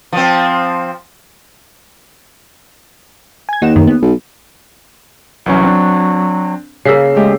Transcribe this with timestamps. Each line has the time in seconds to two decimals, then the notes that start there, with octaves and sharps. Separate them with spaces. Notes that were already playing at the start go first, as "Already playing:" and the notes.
0.13 F3 C4
3.49 G#5 G#6
3.62 D#2 D#4 F#5 E7
3.76 F#2 D#3
3.87 B3
4.02 B1
5.46 C2 E3 F#3 C#4
5.63 C4 D4
6.85 C#3 A#3 E6 B6 C7
7.15 G#3 A3 G4